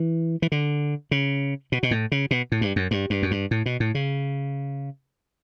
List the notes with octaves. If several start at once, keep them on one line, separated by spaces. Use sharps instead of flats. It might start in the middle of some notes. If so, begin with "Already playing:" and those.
Already playing: E3
E3
D3
C#3
B2
B2
A2
C#3
B2
A2
G2
F#2
G2
G2
F#2
G2
A2
B2
A2
C#3